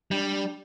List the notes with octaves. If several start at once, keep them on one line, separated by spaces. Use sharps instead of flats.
G3 D4